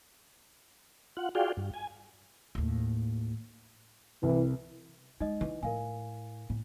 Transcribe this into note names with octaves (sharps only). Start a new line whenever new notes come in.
F4 F#5
F4 F#4 G#4 D5 F5 G5
G2
G#5
D#2 A2
C2 E3
G#3 D#4 D#5
E3
A2 A#4 F5 G#5
A2